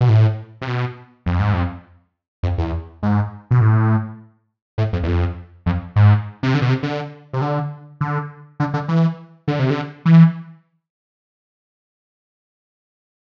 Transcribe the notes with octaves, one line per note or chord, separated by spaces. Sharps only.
B2
A2
C3
B2
F2
G#2
F2
F2
E2
G#2
B2
A2
A2
F2
E2
F2
F2
G#2
C3
D3
B2
C3
D3
C3
D3
D3
D3
D3
E3
D3
C3
D3
E3